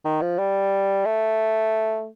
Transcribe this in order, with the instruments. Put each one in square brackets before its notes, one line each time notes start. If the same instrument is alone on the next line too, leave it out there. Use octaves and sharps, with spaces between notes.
[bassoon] D#3
F3
G3
A3